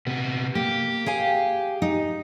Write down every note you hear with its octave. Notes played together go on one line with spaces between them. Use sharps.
C3 B3
A#3 G4
G#4 F5 G#5
D#4